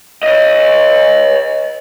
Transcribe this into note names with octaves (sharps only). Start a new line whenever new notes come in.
C#5 D#5